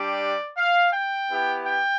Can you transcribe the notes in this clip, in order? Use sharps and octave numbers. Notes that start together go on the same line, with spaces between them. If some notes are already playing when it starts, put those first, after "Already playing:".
Already playing: G3 D4 G4 D5
F5
G5
B3 E4 G4
G5